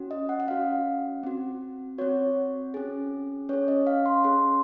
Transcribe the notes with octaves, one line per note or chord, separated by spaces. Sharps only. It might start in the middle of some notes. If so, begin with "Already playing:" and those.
Already playing: C#4 F#4
D#5
F#5
F#5
C#4 F#4 F5
C4 F#4
C4 F#4 C#5
C#4 G#4
C#4 G#4 C#5
D#5
F5
C6
C#4 G#4 C6